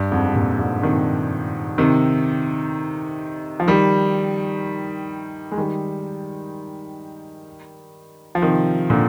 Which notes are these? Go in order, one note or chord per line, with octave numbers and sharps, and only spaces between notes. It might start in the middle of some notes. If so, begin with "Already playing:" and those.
Already playing: G2
F2 G#2
C3
G2 A#2
F2 G#2
C3 D#3
C3 D#3
F3
D#3 G3
G#3
D#3 G3
F3
C3 D#3
A#2 D3